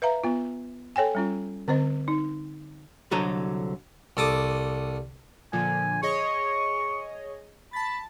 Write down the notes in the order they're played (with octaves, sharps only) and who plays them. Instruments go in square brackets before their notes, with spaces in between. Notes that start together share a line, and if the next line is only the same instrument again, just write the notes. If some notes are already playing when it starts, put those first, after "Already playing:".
[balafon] B4 E5 F5 A#5
B3 F4
A4 C#5 G5 G#5
G3 C#4 F4
D3 C4 C5 D#5
D#4
[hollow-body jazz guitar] C2 D3 F#3 A4 D#5 A#5
[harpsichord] C2 A4 D6 D#6
[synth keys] A#2 D3 F3 [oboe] G#5
[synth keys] G#4 C#5 D#5 [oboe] C#6
[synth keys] A5 A6 [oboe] B5